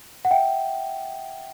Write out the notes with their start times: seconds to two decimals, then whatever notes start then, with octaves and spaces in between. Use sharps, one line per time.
0.25 F#5
0.31 E5 G5